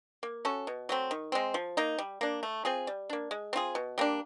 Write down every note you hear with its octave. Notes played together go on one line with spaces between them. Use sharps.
A#3
C#4 F#4 A4
B2
F#3 A3 C4
D#3
G#3 C4
F3
A#3 D#4
G3
A#3 D4
A3
C4 F4 G#4
G3
A#3 D4
G#3
C4 F4 G#4
B2
G3 A#3 D4